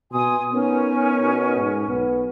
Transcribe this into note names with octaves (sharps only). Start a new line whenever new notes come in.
B2 G#5 C6 D#6
B3 C#4 D#4 A#4
B2
G#2
B1 B3